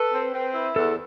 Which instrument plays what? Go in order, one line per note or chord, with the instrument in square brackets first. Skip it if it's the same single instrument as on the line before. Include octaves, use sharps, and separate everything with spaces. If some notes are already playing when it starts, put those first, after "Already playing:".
Already playing: [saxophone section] A4 [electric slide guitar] B4
[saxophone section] C4
C4
E4
[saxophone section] E2 [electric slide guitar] A4